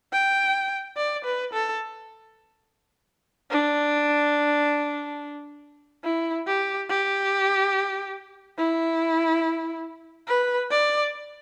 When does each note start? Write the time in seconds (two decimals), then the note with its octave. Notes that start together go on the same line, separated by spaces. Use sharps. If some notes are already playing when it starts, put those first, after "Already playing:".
0.13 G5
0.97 D5
1.24 B4
1.53 A4
3.51 D4
6.04 E4
6.47 G4
6.89 G4
8.58 E4
10.27 B4
10.70 D5